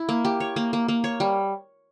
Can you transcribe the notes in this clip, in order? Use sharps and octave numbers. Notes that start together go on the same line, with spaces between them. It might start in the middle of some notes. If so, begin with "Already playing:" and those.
Already playing: E4
A#3
G4
C#5
A#3
A#3
A#3
C#5
G3